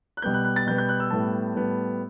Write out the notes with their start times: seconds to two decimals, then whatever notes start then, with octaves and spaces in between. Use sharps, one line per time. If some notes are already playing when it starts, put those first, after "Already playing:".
0.17 F#6
0.22 B2 G3 B3 G6
0.34 F#6
0.45 F#6
0.56 A6
0.67 B2 G3 B3 G6
0.78 G6
0.89 F#6
1.00 E6
1.11 A2 G3 B3 A5
1.55 A2 G3 B3